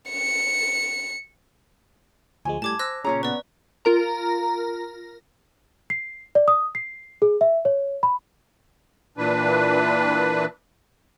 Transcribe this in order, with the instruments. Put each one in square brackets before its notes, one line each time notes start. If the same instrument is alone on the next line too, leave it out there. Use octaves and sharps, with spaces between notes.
[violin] C#7
[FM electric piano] D2 F3 G#3 [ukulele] G#5
[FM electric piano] A2 G3 [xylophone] A5 D6 G#6
[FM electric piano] C5 [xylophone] E6 F#6 A#6
[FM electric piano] A#2 C#3 [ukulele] C#4 G#4 A#5 [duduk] C#5
[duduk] B3 [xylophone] B4 D5
[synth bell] F4 A#4 A#5
[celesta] C7
D5
D#6
C7
G#4
E5
C#5
B5
[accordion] A#2 E3 D4 B4